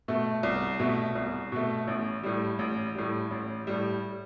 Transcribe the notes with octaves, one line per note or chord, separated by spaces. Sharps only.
B2 A3
C2
B2 A3
C2
B2 A3
A1
A2 G3
A1
A2 G3
A1
A2 G3